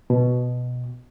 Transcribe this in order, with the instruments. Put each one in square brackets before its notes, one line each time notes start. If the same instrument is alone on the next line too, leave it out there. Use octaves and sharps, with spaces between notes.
[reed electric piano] B2